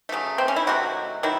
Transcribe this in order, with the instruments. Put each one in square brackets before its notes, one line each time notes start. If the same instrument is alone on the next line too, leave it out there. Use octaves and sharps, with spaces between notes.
[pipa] C#3 F#3 A3
C4
C#4
E4
C3 D#3 F#3 A3 F#4
D#3 F#3 E4